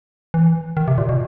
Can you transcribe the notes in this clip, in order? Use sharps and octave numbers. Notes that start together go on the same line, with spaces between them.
E3
D#3
C3
A#2
B2